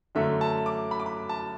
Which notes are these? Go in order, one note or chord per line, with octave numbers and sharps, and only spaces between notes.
F#2 D3 A3 E5
A5
D6
B5
D6
B5
A5